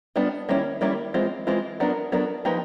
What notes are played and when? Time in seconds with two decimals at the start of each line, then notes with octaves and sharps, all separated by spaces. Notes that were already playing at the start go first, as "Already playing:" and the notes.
0.16 G3 B3 D4 F4
0.49 D#3 G3 A#3 C#4 E4
0.81 D#3 G3 A#3 C#4 E4
1.14 E3 G#3 C4 F4
1.47 E3 G#3 C4 F4
1.80 F#3 B3 D4 F4 A#4
2.12 F#3 B3 D4 F4 A#4
2.45 F3 A#3 D#4 G4 B4